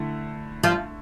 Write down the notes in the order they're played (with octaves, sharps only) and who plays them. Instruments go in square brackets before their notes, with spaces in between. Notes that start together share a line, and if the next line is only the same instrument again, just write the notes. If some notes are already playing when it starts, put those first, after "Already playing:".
Already playing: [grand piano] D3 A3 E4
[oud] F3 F4